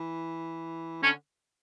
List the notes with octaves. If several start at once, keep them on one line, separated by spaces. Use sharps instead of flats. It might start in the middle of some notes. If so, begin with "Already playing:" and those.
Already playing: E3
D3 C#4